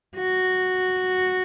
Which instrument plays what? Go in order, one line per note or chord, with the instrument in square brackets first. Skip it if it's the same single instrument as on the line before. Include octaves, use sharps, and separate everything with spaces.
[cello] F#4